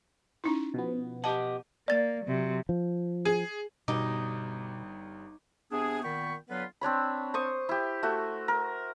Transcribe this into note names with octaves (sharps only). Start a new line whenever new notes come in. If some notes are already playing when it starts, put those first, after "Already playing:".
C#4 D#4 E4
B2 F3 B3
G4 D#5 F#5 A5
A#3 D5 A6
C3 F#3
F3
G#4
G1 B2 G3 D#4 D6
C3 B3 D4 G#4
A#2 D#3 B3 G5 B5 C#6
D3 F#3 B3 F4 B4
C4 D4 C#5 B5
C5 C#6 D#6
E4 G4
A3 F#4
A#4